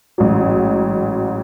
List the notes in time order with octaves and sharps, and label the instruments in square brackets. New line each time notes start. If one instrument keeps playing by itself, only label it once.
[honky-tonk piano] A1 G#2 F#3